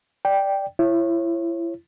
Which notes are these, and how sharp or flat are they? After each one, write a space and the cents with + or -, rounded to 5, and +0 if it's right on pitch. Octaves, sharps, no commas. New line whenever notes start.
D5 +0 G5 +0
E4 +30 C#5 -30